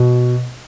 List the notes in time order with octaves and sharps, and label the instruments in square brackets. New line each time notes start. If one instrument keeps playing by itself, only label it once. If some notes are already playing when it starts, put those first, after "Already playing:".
Already playing: [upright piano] B2